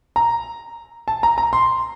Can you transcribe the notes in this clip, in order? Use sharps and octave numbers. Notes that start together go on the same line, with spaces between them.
A#5
A5
A#5
A#5
C6